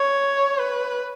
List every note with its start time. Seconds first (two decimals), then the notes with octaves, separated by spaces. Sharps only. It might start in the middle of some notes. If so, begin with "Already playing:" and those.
Already playing: C#5
0.58 B4